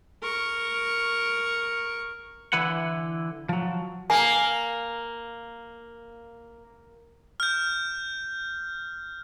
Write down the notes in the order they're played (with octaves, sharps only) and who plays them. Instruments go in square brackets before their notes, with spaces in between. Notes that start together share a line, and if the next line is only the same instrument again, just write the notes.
[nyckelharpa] A#4 C#6
[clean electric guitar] D3 E3 E4 B4 F#5
F3 F#3
[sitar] A#3 [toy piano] G#5
[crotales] F6 G6